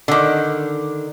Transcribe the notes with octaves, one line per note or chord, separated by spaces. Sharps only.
D3 D#3